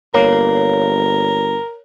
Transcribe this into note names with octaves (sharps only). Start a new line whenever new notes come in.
G1 A#3 A#4 C#5